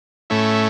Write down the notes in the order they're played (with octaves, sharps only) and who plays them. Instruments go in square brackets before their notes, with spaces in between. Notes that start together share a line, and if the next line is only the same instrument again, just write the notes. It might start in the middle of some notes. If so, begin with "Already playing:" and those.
[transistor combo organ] A2 A3 C#4 E4